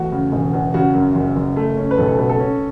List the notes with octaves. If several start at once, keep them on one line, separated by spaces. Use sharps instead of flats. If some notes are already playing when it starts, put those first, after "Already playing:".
Already playing: E2 A3 F#4
C#3
E1
E2
C#3 F#4
F#2
F#1
F#1
A3
C#4
B4
B1 A4
A4
B2 B4
A4
C#4